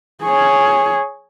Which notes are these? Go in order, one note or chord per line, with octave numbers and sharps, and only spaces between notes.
G#4 C#5